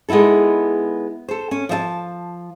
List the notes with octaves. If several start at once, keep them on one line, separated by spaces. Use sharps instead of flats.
G#3 B3 D#4 E4 A4
A4 C5
C#4
F3 E5 A5